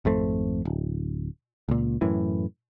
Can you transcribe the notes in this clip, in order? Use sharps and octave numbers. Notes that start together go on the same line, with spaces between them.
G#1 F2 A3 C4
D1
C#2 A#2
F#2 A2 E3